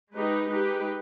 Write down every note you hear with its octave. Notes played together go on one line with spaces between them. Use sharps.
G#3 D#4 G4 B4
G#3 D#4 G4 B4